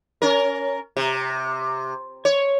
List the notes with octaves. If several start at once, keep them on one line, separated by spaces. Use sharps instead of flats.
C#4 A#4
C3
C#5